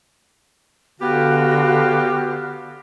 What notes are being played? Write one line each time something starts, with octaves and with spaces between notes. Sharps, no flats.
D3 B3 F#4 G4 F5